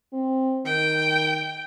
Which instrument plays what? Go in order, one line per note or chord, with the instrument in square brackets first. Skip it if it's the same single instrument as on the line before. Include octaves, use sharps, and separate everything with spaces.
[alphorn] C4
[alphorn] D#3 [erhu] G5